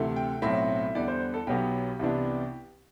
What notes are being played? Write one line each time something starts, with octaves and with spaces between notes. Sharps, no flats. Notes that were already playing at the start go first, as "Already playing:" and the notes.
Already playing: D2 C3 E3 A3
G5
B1 A2 F#3 A3 C4 E5
E2 D3 G3 D5
C5
A4
B1 B2 F#3 B3 G4
C2 C3 E3 B3 D4